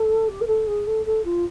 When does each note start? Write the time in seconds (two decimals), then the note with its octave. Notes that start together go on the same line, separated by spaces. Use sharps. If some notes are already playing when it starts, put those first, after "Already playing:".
Already playing: A4
0.28 G4
0.41 A#4
0.47 A4
0.66 G#4
0.86 A4
1.05 A4
1.24 F4